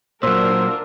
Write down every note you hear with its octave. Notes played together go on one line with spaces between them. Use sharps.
A#2 F#3 D4 F4 A#4 C5 E6